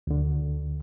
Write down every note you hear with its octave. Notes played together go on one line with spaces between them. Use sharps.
D2 D3